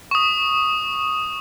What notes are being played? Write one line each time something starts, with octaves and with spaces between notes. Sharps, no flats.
C#6 D#6